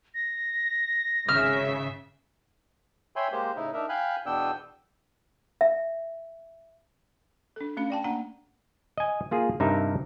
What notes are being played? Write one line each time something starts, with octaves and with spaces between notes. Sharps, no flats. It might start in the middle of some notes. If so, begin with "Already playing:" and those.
A#6
G#1 C#3 E5 F6
C#5 E5 G5 G#5 B5 C6
G#3 A#3 G4 C5
A2 C#3 D#4 E4
D4 D#4 A#4 E5
F5 G5 G#5 B5 F#6
E2 B2 B3 D4 G5 E6
E5
D4 A4
A3 C#4 F5 B5
D5 G5 A5
A#3 D4 F#5 A#5
D#5 G#5
A#3 F4 G#4
G2 C3 D#4 A#4 E5